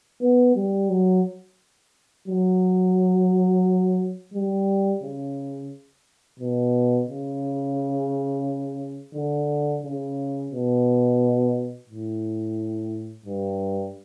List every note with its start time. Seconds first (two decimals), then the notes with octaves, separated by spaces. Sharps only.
0.21 B3
0.56 G3
0.90 F#3
2.28 F#3
4.33 G3
5.02 C#3
6.39 B2
7.07 C#3
9.14 D3
9.83 C#3
10.51 B2
11.89 A2
13.26 G2